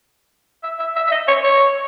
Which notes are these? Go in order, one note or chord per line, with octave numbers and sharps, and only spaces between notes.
E5
E5
E5
E5
D#5
C#5
C#5